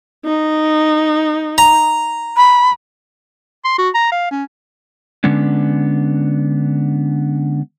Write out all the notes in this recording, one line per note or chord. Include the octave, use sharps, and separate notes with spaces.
D#4
A#5
B5
C6
F#4
A#5
F5
C#4
D3 G#3 B3 C#4 D4